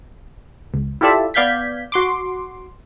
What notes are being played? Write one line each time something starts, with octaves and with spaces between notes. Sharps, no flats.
C#2
E4 F4 G4 A4 D5 E5
B3 D5 F5 G6 G#6 B6
F#4 C6 D6